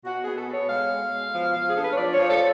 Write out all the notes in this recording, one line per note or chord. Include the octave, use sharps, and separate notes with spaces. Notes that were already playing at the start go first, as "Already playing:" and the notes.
B2 F#4
G#4
B3
A4
B3 C#5
G#3 F5
G#3
B2
F3
F3
G#4
D4 A4
B4
C#5
F3 D5
C#5
F3
A4